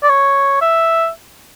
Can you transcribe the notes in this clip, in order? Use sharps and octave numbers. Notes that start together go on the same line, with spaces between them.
D5
C#5
E5